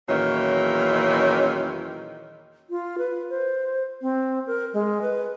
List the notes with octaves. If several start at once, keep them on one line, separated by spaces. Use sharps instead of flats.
E2 A#2 D#3 E3 F#3 C#4
F4
B4
C5
C4
A#4
G#3
B4